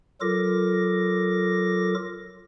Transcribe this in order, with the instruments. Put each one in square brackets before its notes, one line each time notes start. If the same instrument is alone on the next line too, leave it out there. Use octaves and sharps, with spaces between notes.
[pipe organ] F#3 F4 A4 A#4 D6 A#6